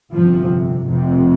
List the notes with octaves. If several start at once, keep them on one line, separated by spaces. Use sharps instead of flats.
G1 F2 C3 F3
F1 F2 C3